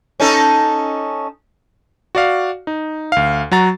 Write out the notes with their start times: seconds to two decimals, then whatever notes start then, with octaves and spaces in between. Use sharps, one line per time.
0.20 C#4 D#4 A4
2.15 F#4 D5 F5
2.67 D#4
3.12 D2 F5
3.52 F#3 F#4 A#5 A6